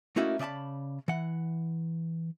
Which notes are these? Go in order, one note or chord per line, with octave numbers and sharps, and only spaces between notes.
A3 A#3 C#4 D#4 E4 F#4
C#3 D5 D#5 A5 B5
E3 F#5